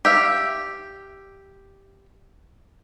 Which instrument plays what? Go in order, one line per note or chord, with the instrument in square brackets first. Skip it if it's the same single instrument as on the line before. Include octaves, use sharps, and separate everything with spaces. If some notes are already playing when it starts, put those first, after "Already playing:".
[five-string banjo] G4 E5 F5